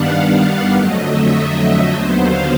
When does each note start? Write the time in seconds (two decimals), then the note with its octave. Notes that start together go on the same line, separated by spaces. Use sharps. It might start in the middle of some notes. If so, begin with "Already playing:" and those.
Already playing: G2 D#3 G3 B3 D4 F5 F#5
0.17 F#5
0.46 F5
0.75 F2 D3 F#3 A3 D#5
1.04 E5
1.34 D#5
1.92 D#2 D3 F#3 B3 C5
2.22 F5